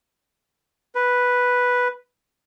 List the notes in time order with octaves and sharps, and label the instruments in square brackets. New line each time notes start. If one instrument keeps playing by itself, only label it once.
[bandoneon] B4